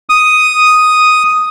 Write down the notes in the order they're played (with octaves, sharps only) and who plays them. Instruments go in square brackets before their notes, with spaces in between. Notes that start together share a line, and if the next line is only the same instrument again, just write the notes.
[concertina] D#6